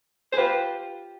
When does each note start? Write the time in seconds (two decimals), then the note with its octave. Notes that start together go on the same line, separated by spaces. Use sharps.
0.33 G#4 C5
0.38 F4 G4 B4